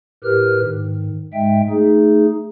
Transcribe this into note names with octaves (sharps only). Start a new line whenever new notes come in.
A2 G4 A#4 B4 F6
G#2 D#3
G#2 G#3 E5 G5
A3 D#4 G#4